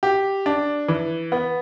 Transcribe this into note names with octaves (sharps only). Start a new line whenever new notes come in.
G4
D4
E3
B3